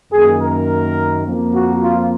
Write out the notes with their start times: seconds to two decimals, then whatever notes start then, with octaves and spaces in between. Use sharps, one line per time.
0.12 F#2 D#3 A#3 G#4
0.40 A#4
1.25 F2 F3 A#3
1.53 F#4
1.82 F4